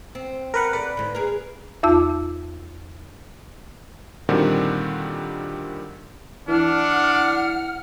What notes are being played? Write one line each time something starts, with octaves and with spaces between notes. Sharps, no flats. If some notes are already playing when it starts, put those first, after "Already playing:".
C4
A#4 B4 F#5
A4 B4 D5
G#2 D3
G#4 A#4
E2 D#4 F4 A5 E6
A#2 D3 D#3 G3 C4 F#4
E3 D4 F#5 F6